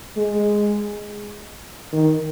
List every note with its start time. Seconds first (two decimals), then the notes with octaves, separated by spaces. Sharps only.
0.17 G#3
1.93 D#3